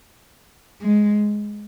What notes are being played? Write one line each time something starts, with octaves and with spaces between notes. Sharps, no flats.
G#3